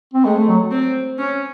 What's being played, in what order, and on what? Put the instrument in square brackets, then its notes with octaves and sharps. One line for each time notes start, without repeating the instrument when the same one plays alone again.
[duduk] C4
[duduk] G#3 [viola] A3
[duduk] F#3
[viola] C4
C#4